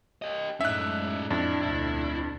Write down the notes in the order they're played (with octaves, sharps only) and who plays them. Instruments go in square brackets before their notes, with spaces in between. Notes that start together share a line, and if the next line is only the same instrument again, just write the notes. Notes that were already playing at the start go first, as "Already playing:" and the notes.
[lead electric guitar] G4 D#5
[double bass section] F#2 A2 G#3 [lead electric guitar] C#4 D#4 [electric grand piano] E5 F#6
[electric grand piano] F2 [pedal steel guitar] D4 [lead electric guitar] E4
[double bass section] D2 B2 [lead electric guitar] E4